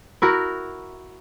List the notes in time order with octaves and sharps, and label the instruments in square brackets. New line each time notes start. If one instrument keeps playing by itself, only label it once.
[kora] E4 F#4 A#4